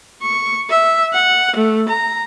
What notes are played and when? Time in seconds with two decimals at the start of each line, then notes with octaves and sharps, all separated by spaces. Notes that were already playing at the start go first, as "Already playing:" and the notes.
0.22 C#6
0.70 E5
1.14 F#5
1.56 A3
1.89 A#5